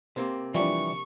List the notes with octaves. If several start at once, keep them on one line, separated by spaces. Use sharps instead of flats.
C3 A#3 C4
E3 F3 G3 D4 C#6